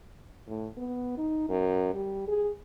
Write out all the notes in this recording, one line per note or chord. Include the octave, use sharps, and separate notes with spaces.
A2
B3
D#4
F#2
G3
G#4